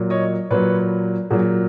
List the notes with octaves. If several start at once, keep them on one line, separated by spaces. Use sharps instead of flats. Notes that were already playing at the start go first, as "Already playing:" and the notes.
Already playing: A#2 F#3
C#5 D#5
A#2 F#3 B4 C#5
A#2 F#3 F#4 G#4